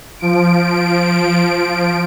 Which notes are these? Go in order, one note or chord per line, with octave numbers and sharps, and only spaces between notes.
F3 D7